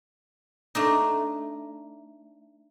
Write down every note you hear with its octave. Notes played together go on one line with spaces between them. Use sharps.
A3 D4 D#4